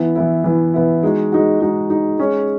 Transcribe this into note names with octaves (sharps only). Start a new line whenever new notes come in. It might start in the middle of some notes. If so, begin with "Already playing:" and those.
Already playing: E3 B3 E4
E3 B3 E4
E3 B3 E4
E3 B3 E4
G#3 D#4 F#4
G#3 D#4 F#4
G#3 D#4 F#4
G#3 D#4 F#4
G#3 C#4 G#4 C#5